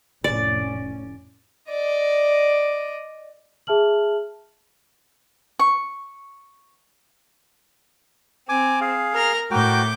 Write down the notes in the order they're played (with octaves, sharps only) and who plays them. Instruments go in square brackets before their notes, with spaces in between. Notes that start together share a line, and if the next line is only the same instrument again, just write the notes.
[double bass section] F1 A2 C#4 [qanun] D5
[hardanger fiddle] D5 D#5
[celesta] G#4 E5 A5 F6 F#7
[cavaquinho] C#6
[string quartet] C4 [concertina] G#5 D6
[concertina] G#4 F5
[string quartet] A#4 A#5 F6
[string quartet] A2 D6 G6 [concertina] F#4 A#4 G5